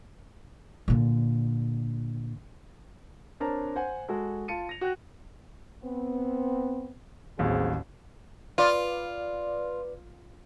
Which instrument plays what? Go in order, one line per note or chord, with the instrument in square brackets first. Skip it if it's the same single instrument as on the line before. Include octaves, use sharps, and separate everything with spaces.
[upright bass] A#2 D3
[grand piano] C4 D4 A#4 C#5 A5 A#5
C5 F#5 G#5
G#3 F#4 A4
F4 A5 C#7 D#7
A#6 F7
F#4 G5 F#6
[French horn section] B3 C4
[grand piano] A1 D#2 F#3 [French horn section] C4 G#4
[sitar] F4 [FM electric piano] B4 D5